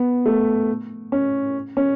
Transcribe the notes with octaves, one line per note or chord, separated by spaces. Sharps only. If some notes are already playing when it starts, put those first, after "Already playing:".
Already playing: B3
A3
C#4
C#4